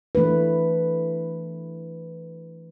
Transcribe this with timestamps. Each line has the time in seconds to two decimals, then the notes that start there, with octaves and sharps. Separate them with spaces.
0.15 E3 A3 D4 B4